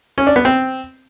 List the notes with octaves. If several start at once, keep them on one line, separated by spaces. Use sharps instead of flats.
C#4
D4
B3
C4